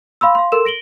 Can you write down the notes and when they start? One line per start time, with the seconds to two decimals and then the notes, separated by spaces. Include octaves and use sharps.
0.21 F5 B5 C6 E6
0.35 F5 C6
0.52 A4 A#4 C6 E6 E7
0.65 A#6 D7 F#7 G7